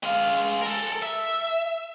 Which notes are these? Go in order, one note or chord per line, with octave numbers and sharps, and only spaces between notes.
G#3 F5
A4 A#4
E5